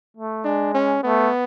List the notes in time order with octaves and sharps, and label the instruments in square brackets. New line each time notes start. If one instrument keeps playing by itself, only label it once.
[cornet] A3
[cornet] G#3 [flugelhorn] D4
[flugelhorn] C#4
[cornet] A3 [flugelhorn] B3